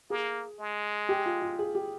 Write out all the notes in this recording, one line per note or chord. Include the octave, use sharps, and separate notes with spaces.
A#3 G#4
G#3
G4
F4
F4
G#4
G4